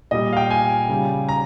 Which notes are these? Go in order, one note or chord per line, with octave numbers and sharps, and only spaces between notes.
A#2 G3 D#5
F5
G5
G#5
C#3 G3
A#5